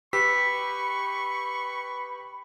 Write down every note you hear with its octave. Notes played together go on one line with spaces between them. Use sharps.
G4 B4 B5 C#6 E6 B6